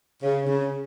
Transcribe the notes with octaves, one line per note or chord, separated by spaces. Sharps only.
C#3
C#3